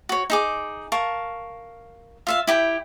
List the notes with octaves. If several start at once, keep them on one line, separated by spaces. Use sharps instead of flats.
F#4 C#5
D#4 G#4 D6
A#4 F5 A5 C#6
F4 E5 F5
E4 G4 G5